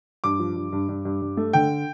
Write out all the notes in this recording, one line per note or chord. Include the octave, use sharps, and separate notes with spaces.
G2 D6
F3
G2
G2
G2
G2
G2
A3
D3 G5